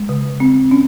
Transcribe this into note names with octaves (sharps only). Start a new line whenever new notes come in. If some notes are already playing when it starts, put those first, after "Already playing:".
Already playing: G#3
C#3
C4
C#4